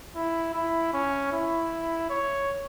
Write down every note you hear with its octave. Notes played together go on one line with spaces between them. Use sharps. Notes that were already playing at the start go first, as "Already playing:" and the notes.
E4
E4
C#4
E4
C#5